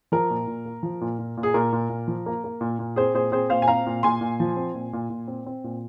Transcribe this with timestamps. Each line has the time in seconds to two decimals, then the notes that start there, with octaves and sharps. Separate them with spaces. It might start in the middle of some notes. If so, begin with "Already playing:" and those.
0.12 F3 A#4
0.30 A#2
0.47 A#2
0.65 A#3
0.83 F3
1.01 A#2
1.19 A#2
1.37 A#2
1.43 G#4
1.54 A#2 A#4
1.72 A#2
1.89 A#2
2.08 F3
2.26 A#3
2.44 A#3
2.61 A#2
2.79 A#2
2.96 C4 G#4 C5
3.14 A#2 G#4 C5
3.32 C4 G#4 C5
3.50 A#2 C5 F5
3.62 G#5
3.67 C4 F5 A#5
3.86 A#2
4.03 A#2 G#5 C6
4.21 A#2
4.40 F3
4.56 C4
4.75 A#2
4.93 A#2
5.10 A#2
5.28 C4
5.46 C4
5.64 A#2